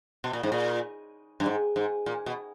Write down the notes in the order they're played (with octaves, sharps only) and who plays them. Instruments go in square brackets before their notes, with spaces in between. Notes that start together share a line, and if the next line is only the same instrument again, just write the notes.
[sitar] B2
A#2
G#2
A#2
G2
G#2
G#2
A#2
B2